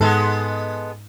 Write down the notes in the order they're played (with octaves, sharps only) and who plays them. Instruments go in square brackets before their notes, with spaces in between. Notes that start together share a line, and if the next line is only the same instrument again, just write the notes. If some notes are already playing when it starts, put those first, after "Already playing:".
[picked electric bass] G#2 [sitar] G#3 B3 A4